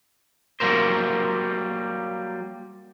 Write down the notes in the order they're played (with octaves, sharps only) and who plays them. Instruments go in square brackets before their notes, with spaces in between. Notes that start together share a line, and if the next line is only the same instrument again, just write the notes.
[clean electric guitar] F#3 G3 A#3 A#4 C5